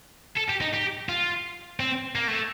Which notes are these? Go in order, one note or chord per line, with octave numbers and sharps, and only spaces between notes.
A4
G4
D#4
G4
F4
C4
A#3
A3